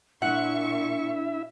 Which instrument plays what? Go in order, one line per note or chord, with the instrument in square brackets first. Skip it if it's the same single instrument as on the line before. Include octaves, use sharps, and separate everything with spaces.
[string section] A#2 C#6 [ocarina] D4 [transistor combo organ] E4 E5 [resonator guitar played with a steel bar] F#5